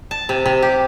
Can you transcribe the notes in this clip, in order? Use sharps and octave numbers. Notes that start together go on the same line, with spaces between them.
A5
C3
C3
G4